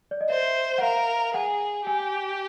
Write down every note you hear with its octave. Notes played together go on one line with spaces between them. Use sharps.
D5
D#5
C5 E5
F#5
A#4 F5
G#4 F#5
G4 G#5